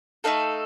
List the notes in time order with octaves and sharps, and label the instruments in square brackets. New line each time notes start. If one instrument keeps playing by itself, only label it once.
[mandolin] A3 D#4 A4 F5